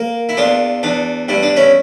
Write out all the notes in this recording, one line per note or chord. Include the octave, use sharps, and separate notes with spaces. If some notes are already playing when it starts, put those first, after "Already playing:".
Already playing: A#3
E4
E2 D4 F4
E2 D4
G2 E4
D4
C#4 E4